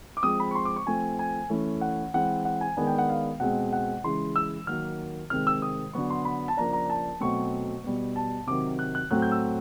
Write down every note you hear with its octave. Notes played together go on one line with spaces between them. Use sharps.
D6
F3 G#3 C4 D#6
B5
C#6
C6
D6
C#6
F3 A3 C4 G#5
G#5
E3 A3 C#4
F#5
E3 G#3 C4 F#5
F#5
G#5
D#3 G#3 B3 D4 G#5
G5
F#5
F5
B2 G#3 C4 F#5
F#5
C#3 E3 G#3 C6
E6
D#3 F#3 A#3 F6
C3 D#3 G#3 C4 F6
E6
D#6
D3 F#3 B3 C#6
C6
B5
A5
C#3 F3 A#3 D4 A#5
A#5
A5
B2 F#3 A3 C4 C#6
B2 G3 B3
A5
C3 D#3 F#3 D6
F#6
F#6
A2 F#3 A3 C4 F#6
G6
E6